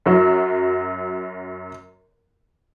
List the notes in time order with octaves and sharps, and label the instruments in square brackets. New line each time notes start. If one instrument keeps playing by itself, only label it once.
[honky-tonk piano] F#2 F#3